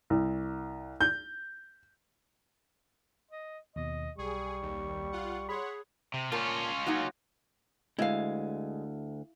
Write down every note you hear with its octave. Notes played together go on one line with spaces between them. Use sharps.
C2
G6
D#5
D#2 B2 D#5
B1 G3 G#4 C#6
D#2
F4 F#5
G#4 C#5 F#5 B5 C6
C3
A#2 C#4 F4 A#4 A5
F#3 A#3 D#4
D2 G#3 E4 F5